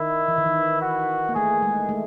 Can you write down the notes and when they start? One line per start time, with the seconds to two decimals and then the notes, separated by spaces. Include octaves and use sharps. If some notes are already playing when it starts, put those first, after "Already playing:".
Already playing: D#3 E4
0.28 E3
0.38 D#3
0.46 E3
0.82 F#4
1.29 A#3
1.36 A3 G#4
1.63 G#3
1.89 A3